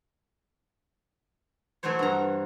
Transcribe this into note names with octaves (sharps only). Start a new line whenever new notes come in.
E3 F#3 A3 C5 C#5
G2 A#5